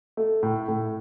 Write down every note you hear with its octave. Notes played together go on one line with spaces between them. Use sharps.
A3
A2
A2